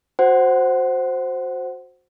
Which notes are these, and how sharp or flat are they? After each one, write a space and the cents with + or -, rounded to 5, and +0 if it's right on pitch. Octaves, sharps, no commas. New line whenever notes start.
F#4 -20 C5 +0 F#5 +15